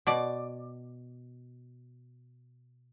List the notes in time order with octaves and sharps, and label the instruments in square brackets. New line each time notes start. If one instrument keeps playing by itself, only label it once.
[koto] B2 D5